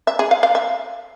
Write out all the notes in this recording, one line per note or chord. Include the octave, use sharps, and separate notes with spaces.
E5
G#4
F5
F5
E5